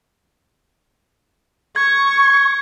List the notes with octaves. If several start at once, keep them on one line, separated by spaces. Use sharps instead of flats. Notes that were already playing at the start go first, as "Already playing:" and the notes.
C#6 G#6